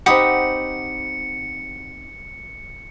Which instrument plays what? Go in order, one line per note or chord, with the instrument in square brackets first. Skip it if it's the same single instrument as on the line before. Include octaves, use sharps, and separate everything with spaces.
[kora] C4 D#4 G4 [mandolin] F#5 B5 D#6 [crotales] C#7